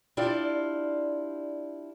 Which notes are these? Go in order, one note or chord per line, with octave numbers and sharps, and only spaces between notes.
D4 E4 F4 G4 D5